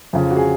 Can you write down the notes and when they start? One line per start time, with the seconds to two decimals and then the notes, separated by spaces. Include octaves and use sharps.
0.13 F2 C#3 F3
0.31 F#4
0.36 G#4